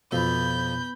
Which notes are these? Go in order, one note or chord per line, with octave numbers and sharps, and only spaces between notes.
F2 B2 F3 B3 B5 G6